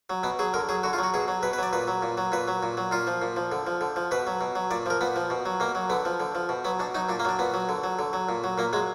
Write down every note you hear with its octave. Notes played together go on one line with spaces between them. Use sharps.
F#3
B2 B3
F#3 G#4
D3 A#4
F#3 G#4
D3 F#4
F4
F#3 F#4
B2 G#4
F#3
B2 B4
B4
F#3 D5
A#2 B4
F#3
A#2
F#3
A#2 B4
F#3
A#2
F#3
A#2 F4
F3
A#2
F3
D3
F3
D3
F3
B2 B4
F#3
B2
F#3
A#2 D5
F3 A#4
A#2 B3
F3
B2
F#3
B2 A#3
F#3
D3 B3
F3
D3
F3
B2
F#3 B3
B2 D4
F#3 D#4
A#2 D4
A#3
F#3 D4
A#2 B3
F#3
D3
F#3
D3
F#3
A#2
F#3
A#2 A#3
F#3 G#3